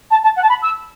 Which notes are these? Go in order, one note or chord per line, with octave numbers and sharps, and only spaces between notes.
A5
A5
F#5
A5
B5
E6